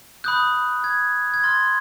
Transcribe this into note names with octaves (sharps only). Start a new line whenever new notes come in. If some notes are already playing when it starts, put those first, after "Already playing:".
B5 D#6 F#6 G6
G#6
G#6
C6 F6 A6